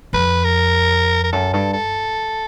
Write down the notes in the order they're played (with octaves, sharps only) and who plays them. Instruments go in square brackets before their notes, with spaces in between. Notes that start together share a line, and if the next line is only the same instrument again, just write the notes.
[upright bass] F2 [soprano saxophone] B4
[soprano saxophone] A#4
A#4
[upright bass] F#2 [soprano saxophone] A4
[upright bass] G2 [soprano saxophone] A4
[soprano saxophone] A4